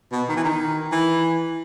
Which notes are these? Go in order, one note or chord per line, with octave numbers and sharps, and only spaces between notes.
B2
D#3
E3
D#3
E3